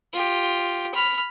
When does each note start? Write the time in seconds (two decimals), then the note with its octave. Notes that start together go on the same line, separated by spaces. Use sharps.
0.13 F4 G4
0.94 B5 F6